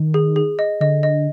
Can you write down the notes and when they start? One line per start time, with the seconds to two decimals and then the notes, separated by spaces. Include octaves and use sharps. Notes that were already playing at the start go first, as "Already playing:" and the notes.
Already playing: D#3
0.14 G#4
0.36 G#4
0.59 D#5
0.81 D3 D#5
1.03 D#5